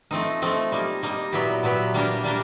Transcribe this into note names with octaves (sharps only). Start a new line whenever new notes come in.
F3 A3 C4 D#4
F3 A3 C4 D#4
G3 A#3 D#4
G3 A#3 D#4
A#2 F#3 B3 E4 G4
A#2 F#3 B3 E4 G4
G3 A#3 D4 G4 A#4
G3 A#3 D4 G4 A#4